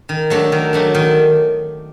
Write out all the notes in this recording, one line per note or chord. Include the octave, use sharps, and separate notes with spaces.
D#3
F#3 A3 D4
D#3
F#3 A3 D4
D#3